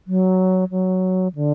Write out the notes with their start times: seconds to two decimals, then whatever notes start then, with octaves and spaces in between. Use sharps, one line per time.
0.07 F#3
0.71 F#3
1.35 D3